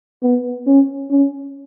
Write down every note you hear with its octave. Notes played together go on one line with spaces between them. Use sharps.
B3
C#4
C#4